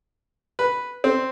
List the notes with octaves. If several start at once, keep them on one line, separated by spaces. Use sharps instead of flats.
B4
C4